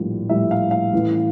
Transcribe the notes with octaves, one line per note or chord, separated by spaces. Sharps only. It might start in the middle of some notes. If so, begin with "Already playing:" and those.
Already playing: A#1 A2 G3
A#1 A2 G3 E5
F5
F5
A1 A2 E3